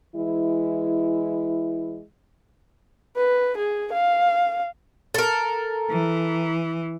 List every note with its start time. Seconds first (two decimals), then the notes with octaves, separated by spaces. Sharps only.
0.15 E3 G#3 E4
3.17 B4
3.58 G#4
3.93 F5
5.14 A4 A#4
5.90 E3